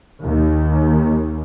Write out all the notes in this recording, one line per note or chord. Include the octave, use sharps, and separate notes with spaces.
D#2